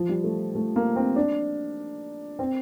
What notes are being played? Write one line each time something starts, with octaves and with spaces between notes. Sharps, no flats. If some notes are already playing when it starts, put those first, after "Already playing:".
Already playing: F3
G3
A3
A3
A#3
C4
D4
C4